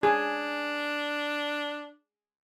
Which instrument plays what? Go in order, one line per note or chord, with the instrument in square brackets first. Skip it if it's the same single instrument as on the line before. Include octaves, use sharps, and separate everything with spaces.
[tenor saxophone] D4 [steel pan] G#4